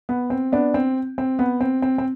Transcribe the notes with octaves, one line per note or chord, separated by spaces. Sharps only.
B3
C4
B3 D4
C4
C4
B3
C4
C4
C4